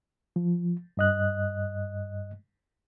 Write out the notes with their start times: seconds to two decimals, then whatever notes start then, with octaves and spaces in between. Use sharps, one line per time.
0.36 F3
0.97 G2 D#5 F#6